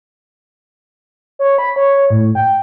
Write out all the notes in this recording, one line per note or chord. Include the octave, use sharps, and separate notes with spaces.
C#5
B5
C#5
C#5
A2
G5